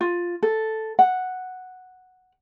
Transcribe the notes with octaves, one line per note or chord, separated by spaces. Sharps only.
F4
A4
F#5